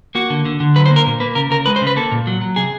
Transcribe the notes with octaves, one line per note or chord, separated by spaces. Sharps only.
A#3 F#4
D3
D3
D3
F#3 B4
C5
A#3
A#4
A#2
A#3 B4
C#3 A#4
C#3 A#4
G#3 B4
C5
C#3
B4
A#3 A4
A#2
F#3
F#3
C3 G#4